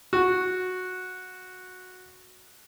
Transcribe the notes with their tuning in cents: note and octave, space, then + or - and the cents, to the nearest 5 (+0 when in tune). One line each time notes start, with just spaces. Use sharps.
F#4 -10